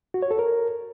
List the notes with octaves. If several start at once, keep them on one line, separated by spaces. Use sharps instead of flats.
F#4
C#5
A4
A#4